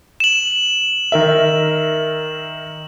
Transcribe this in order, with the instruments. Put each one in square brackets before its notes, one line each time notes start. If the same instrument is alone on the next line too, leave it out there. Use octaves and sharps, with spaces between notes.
[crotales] E7 F#7
[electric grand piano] D#3 A#4 E5